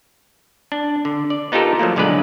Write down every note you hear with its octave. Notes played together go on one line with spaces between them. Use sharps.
D4
D3
D5
B3 D#4 F4 G4 A4 A#4
F3 F#3 A3 A#3
B1 D3 G#3 B3 B4 D5